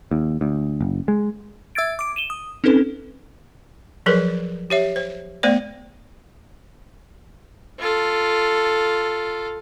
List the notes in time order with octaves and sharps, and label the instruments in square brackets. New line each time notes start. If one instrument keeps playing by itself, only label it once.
[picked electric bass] D#2
D2
F#1
G#3
[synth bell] E5 E6 G#6 A6 D7
D6 D7
D#7 E7 G7
D#6
C4 C#4 D#4 A4 B4
[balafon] F3 F#3 G#4 A#4 B4
G4 C#5 E5
C5
A3 B3 C5 D5
[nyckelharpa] F4 A4